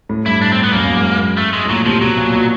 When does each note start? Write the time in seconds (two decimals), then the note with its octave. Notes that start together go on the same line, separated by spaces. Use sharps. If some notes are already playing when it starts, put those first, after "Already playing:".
0.09 A2
0.26 G2 E4
0.42 D4
0.52 C4
0.64 B3
0.73 F#2 A#3
0.84 F#2
0.95 G#2
1.37 A3
1.53 G#3
1.65 A2
1.69 A#2 F#3
1.85 C3 F3
2.01 B2 F#3
2.17 A#2
2.34 B2